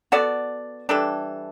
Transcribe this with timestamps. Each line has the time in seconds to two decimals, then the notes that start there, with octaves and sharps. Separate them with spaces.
0.12 B3 F#4 A4 D5
0.89 E3 G3 D4 A4